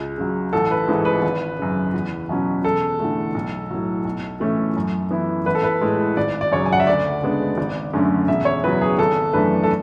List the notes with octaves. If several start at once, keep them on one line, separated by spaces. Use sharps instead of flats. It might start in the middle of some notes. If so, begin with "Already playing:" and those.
Already playing: C#2
C#3 F#3
A1 A4
B4
G#2 E3 G#3
B4
G#1
F#2 C#3
E2
B2 F#3 C#4
E1 A4
E2 D3 A3
B1
A2 F#3
B1
A2 E3 A3 C#4
F#2
E3 B3 E4
A1 B4
A4
B4
A2 G#3
G#1 D5
D5
F#2 C#3 F#3 C#5
G#5
F#5
E5
D2 D5
C#3 G#3 B3 D4
G#1
F#2 D3 A3 C#4
E1 E5
C#5
E2 C#3 F#3 B4
G#4
G#1 A4
F#2 E3 A3 D4 B4
A4